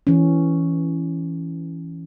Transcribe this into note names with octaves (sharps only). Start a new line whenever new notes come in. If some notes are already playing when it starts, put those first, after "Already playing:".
E3 C#4